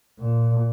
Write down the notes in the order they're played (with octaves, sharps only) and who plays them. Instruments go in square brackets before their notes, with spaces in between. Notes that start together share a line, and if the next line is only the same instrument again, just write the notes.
[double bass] A#2